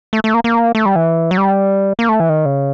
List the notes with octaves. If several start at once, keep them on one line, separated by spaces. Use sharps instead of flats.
A3
A3
A#3
A#3
A3
G3
E3
F#3
G3
A#3
A3
E3
D#3
C#3